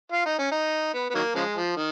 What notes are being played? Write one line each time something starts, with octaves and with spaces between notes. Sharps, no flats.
F4
D#4
C#4
D#4
B3
B3
D#3 F#3 A#3
C#3 F3 G#3
F3
D#3